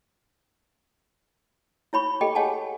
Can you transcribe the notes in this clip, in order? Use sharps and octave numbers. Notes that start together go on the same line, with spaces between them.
E4 C#5 B5 C#6
G4 A4 D#5 G5
G#4 C#5 D#5 F#5 G#5 A5